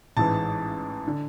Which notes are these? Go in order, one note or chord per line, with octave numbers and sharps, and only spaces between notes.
A1 G#2 E3 A5
D3